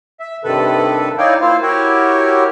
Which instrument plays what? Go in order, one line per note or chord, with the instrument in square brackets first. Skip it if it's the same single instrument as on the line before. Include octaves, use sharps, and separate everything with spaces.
[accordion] E5
G2 C3 D#3 A4 B4
D#4 E4 C#5 D5 F5 G5
A#3 E4 F4 C5 F5
E4 F#4 G4 A#4 C#5